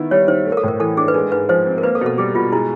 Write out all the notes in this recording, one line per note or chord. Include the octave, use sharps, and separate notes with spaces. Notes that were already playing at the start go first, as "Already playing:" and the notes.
Already playing: D#3 B3 E4
G3 C#5
D#3 C5
A3
A#4
A4
A2 A#4
E3 A4
D4 G#4
B4
G#3 A#4
G#2 B4
F3 C5
C4
A#4
A#3 B4
A4
B2
A4
G3 G#4
B2 F4
G#3 E4